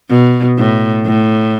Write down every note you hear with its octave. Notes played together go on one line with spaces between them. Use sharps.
B2
A2
A2